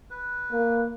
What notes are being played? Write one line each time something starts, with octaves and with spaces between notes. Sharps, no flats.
B4
A#3